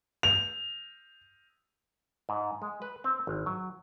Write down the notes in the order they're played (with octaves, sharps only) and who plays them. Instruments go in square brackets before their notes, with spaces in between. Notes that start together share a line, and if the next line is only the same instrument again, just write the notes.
[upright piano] F7
[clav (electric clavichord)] G#2
G#3
B4
C4
G#1
F#3